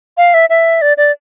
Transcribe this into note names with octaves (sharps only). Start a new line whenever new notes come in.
F5
E5
E5
D5
D5